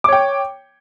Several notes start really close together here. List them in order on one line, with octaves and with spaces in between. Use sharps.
D6 C#5 G5